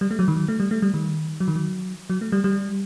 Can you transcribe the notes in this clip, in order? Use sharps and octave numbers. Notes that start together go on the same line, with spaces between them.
G3
A3
F#3
D#3
F#3
A3
G3
A3
G3
D#3
F#3
D#3
F#3
F#3
A3
G3
G3